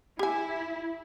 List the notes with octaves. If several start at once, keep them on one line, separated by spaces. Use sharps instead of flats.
E4 G4 G#5